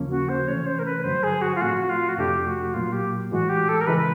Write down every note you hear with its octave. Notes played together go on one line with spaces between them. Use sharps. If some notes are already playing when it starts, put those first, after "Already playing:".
Already playing: D#2 C#3 F3 A#3 C#4
F#4
C5
C3 E3 A3 C#4 C#5
C#5
C5
A#4
B4
G2 D3 F#3 C5
G#4
F#4
F4
A2 F3 A3 C4 F#4
F4
F#4
F2 C3 F3 A3 D4 G4
F#4
A#2 F#3 A#3 F4
G4
A2 E3 G#3 F#4
G4
A4
A#4
C#3 E3 G#3 B4